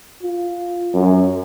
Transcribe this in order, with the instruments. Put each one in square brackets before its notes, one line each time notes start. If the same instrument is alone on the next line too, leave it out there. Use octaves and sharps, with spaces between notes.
[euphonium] F4
F#2